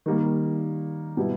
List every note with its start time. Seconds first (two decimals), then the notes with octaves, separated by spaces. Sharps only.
0.06 D#3 G3 A#3
1.17 B2 G3 B3 E4